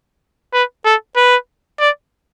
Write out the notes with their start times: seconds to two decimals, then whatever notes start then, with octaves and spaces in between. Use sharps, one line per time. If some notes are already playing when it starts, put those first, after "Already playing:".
0.53 B4
0.85 A4
1.17 B4
1.80 D5